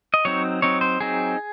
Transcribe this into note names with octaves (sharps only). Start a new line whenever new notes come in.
D#5
F#3 C4 D#4 C#5
F#3 C4 D#4 C#5
C5
F#3 C4 D#4 G#4